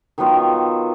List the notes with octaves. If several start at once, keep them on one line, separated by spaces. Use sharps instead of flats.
D#3 F#3 B3 F4